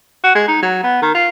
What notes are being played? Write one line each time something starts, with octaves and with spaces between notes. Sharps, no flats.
F#4
G#3
D#4
F#3
B3
D#3
F4